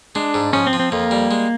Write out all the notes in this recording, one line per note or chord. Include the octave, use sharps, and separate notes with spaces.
G#3 D4
G#2
F3 C#4
C4
F3
C4
F2 A#3
G3
G#3